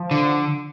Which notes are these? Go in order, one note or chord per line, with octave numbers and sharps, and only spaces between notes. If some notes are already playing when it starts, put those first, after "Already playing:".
Already playing: F3
D3